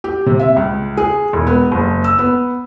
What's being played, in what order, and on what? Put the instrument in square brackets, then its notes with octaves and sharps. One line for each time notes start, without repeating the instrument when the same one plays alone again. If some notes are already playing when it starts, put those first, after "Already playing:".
[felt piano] G4
C3
E5
C#2
G#4
E1
B3
F#1
E6
B3